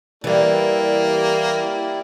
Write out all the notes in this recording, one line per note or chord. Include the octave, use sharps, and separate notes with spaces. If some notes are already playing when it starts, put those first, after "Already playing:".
E3 G3 A#3 E4 G4 D5